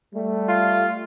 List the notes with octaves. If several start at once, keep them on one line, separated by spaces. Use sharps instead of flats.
G3 A3
F4